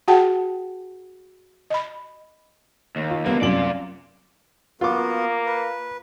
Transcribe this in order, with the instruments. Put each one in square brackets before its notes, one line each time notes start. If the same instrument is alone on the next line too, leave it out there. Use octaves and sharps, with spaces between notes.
[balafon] F#4 G#4 F#5 G5 A5
D#5 B5
[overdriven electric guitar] D#2
[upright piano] F4
[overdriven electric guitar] D3 A#3 [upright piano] G3 B3
[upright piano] C2 F#2 F#7 [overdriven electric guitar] F4 D5
[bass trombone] A#3 [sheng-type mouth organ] B3 F#4 [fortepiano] F4 D6
[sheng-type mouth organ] B4